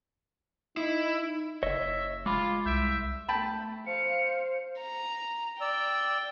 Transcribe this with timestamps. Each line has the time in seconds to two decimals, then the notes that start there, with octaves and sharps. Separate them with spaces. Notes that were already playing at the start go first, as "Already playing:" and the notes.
0.77 D#4 E4
1.63 F#1 C#5 D#5 E5
2.26 G#3 F4 B5 D6
2.66 C2 E5 G6 D7
3.28 A3 G5 A5 B5
3.87 C5 F5 C#7
4.80 A#5
5.61 D5 G5 E6